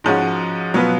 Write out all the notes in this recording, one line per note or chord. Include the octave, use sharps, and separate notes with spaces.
G#2 F3 G#3 C#4 F#4
B2 F#3 B3 F4 B4